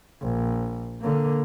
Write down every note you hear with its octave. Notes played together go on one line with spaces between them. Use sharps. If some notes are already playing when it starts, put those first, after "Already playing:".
A#1
D3 A#3